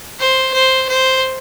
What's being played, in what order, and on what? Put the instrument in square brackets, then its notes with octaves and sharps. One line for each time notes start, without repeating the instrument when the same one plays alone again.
[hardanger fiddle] C5
C5
C5